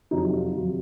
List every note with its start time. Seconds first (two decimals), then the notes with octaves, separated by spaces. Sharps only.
0.11 F2 C3 F#3 D#4
0.33 F4
0.55 F2 C3 F#3